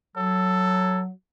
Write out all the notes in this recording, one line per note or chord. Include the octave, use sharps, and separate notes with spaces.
F#3 A4